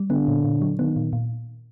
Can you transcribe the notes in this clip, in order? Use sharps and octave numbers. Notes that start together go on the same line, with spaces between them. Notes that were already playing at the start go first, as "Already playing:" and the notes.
Already playing: G3
D3 B3
A#2
A#2
F#3
D#3 B3
A#2
A#2